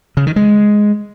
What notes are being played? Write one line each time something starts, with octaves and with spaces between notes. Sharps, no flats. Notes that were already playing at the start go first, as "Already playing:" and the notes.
C#3
D#3
G#3